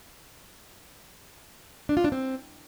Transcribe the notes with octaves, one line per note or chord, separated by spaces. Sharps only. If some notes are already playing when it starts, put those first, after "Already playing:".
D4
F4
D4
C4